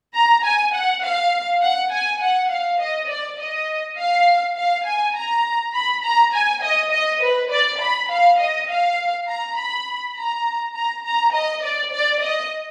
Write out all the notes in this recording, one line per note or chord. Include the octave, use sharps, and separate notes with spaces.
A#5
G#5
F#5
F5
F#5
G#5
F#5
F5
D#5
D5
D#5
F5
F5
G#5
A#5
B5
A#5
G#5
D#5
D#5
B4
D5
B5
F5
D#5
F5
A#5
B5
A#5
A#5
A#5
D#5
D5
D5
D#5